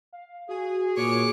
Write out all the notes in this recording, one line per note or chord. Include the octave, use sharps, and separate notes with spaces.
F5
F#4 G#4
A#2 G#3 G#4 C#5 D6 C#7